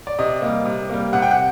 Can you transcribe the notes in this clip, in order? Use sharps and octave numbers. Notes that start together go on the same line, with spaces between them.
D5
C3 D#5
G3 A#3
C3
G3 A#3
C3 F#5
G5
F#5